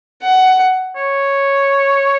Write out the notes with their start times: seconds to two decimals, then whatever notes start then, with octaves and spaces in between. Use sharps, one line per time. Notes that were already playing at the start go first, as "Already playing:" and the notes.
0.22 F#5
0.96 C#5